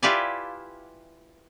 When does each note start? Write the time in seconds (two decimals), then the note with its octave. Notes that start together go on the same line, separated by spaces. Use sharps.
0.03 E4 F4 G4 B4 D5 G#5